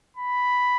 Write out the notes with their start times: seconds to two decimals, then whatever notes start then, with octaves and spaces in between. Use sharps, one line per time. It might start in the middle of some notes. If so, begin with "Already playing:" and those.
0.17 B5